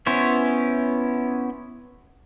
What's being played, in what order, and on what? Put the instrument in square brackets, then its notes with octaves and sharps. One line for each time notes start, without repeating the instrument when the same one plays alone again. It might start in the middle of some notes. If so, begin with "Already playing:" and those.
[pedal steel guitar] B3 C#4 E4 C5 C#5